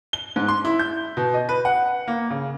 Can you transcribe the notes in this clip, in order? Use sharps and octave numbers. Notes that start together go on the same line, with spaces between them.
G7
G#2
C6
E4
G6
B2
D#5
B4
F#5
A#3
C#3